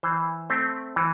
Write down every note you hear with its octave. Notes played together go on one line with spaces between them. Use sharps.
E3 C5
A3 C4
E3